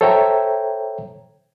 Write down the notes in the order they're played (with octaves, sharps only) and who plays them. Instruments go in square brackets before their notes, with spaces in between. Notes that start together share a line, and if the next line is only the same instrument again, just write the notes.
[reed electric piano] A4 C5 C#5 E5 G5 A#5